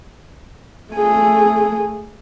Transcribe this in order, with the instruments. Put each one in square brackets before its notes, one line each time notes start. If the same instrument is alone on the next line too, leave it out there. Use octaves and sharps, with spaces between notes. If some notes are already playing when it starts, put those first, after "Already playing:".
[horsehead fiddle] A3 G#4